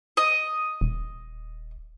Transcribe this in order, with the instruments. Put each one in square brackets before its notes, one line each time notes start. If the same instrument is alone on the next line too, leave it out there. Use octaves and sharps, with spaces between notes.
[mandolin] D#5
[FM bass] D#1